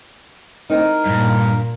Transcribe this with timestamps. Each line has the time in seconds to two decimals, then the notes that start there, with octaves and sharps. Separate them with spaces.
0.70 C4 D#4 A#4
1.06 G2 A#2